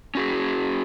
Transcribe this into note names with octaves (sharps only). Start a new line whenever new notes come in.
C#4 F#4 G#4